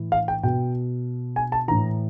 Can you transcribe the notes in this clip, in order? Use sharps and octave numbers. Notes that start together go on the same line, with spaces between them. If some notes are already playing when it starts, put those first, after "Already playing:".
Already playing: A2 E3
F5
G5
B2 G5
G#5
A5
A2 E3 A#5